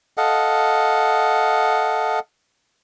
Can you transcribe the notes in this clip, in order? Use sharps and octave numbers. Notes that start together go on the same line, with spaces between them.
A4 D#5 F5 F#5